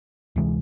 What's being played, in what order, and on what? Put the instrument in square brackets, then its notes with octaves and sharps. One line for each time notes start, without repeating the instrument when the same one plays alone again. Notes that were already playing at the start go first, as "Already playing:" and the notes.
[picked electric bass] D2 C3 E3 G#3